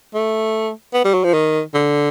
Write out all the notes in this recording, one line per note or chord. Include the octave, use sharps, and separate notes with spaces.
A3
B3
G3
F#3
F3
D#3
D3